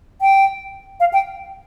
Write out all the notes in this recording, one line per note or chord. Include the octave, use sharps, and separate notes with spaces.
G5
F5
G5